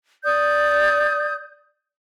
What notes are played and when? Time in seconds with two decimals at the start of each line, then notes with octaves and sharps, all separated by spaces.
0.24 D5 D#6 G6